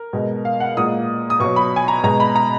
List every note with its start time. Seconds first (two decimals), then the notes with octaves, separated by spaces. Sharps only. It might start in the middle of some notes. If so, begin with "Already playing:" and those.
Already playing: A#4
0.13 B2 G#3
0.45 F5
0.60 F#5
0.77 A#2 G#3 D#6
1.30 D#6
1.40 B2 F#3 C#6
1.56 B5
1.76 G#5
1.88 A#5
2.03 B2 G#3 A#5
2.20 B5
2.36 A#5